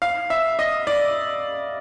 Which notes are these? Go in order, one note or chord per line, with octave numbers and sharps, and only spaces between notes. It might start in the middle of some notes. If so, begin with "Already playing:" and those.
F5
E5
D#5
D5